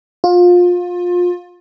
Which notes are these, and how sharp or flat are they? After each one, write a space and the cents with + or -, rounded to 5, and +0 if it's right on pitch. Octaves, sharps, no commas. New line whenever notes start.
F4 +25